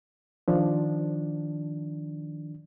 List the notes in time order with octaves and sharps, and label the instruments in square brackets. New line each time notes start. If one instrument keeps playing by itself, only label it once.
[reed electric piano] D#3 F3 D4